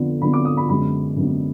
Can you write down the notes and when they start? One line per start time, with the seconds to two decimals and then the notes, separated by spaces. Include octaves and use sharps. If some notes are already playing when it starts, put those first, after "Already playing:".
Already playing: F2 D3 F3 B3
0.21 F2 D3 F3 B3 B5
0.33 D6
0.45 D#6
0.57 B5
0.69 F#2 D3 G#3 B3 B5
1.17 F#2 D3 G#3 B3